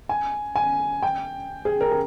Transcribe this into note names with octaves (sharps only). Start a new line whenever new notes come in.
G#5
G#5
G5
G#4
A#4
G#4